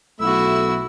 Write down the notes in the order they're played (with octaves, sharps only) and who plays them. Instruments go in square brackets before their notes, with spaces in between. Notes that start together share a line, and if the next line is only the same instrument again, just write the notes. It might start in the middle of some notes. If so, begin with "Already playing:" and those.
[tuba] B1 [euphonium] A3 [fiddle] E4 F#4 [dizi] E6